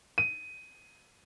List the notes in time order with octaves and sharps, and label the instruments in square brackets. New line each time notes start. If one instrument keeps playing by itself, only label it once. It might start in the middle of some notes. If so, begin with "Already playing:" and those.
[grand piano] D#7